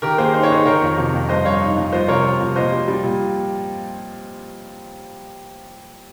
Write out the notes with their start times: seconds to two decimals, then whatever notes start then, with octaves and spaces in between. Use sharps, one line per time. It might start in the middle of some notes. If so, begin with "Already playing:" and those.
0.02 D#3 G4 A#4
0.18 A#3 G#4 C5
0.34 D#4 C5
0.43 C#5
0.50 D#4 G#4 C5
0.65 D#3 A#4 C#5
0.81 F2
0.97 C3
1.14 F2
1.29 G2 C5 D#5
1.45 G2 C#5 F5
1.61 D#4
1.77 G2
1.92 F3 C5 D#5
2.08 C3 A#4 C#5
2.25 F3
2.41 C3
2.56 A#2 C5 D#5
2.72 G3
2.88 G3
3.03 A#2